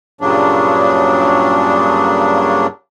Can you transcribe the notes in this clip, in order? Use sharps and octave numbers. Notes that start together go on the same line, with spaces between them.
G2 A#2 C#3 F#3 D4